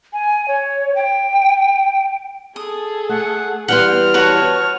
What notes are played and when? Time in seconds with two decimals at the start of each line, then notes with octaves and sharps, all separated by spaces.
0.13 G#5
0.48 C#5
0.95 G5
2.56 G#4 A4 D#6
3.09 A3 F#5
3.68 E3 G3 B3 F#5 G5 C6 F6
4.14 F#4 B4 C#5 A5